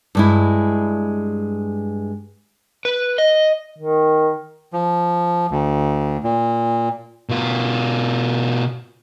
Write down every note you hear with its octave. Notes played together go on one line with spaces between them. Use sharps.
G2 G#3 E4
B4
D#5
D#3
F3
D2
A#2
B2 F4